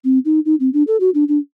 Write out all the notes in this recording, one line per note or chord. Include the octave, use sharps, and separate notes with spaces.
C4
D#4
D#4
C4
D4
A4
F#4
D4
D4